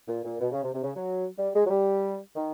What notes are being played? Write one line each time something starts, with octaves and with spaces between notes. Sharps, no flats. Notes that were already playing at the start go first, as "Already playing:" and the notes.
A#2
A#2
B2
C#3
C3
C3
C#3
F#3
G3
G#3
F#3
G3
D#3